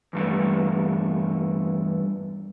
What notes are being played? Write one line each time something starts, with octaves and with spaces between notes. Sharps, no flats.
E2 G2 A3